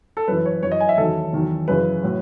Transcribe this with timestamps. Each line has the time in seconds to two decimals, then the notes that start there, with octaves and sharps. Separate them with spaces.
0.17 A4
0.28 F#2 E3 B4
0.45 C#5
0.63 F#2 E3 C#5
0.72 D#5
0.80 G#5
0.89 E5
0.98 E2 D#3 F#3 A4
1.33 E2 D#3 F#3
1.68 F#2 C#3 E3 B4
2.03 A2 F#3